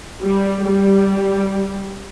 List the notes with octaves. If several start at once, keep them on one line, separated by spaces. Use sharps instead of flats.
G3
G3